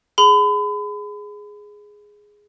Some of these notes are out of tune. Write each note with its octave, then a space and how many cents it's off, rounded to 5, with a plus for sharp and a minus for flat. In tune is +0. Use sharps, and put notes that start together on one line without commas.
G#4 +0 B5 +35